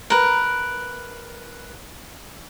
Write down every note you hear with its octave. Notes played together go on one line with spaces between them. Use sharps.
A#4 B4